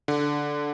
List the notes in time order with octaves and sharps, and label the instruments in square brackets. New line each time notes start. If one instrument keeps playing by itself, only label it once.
[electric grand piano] D3